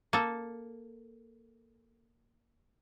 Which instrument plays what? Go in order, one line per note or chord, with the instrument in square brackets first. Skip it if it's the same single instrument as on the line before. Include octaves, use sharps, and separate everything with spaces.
[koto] A#3 A4